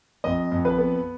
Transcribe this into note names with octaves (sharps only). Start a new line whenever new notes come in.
F2 D#5
F2
B4
B3